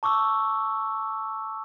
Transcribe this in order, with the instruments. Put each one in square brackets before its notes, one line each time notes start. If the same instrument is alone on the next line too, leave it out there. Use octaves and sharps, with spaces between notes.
[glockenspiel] A5 C#6 D6 E6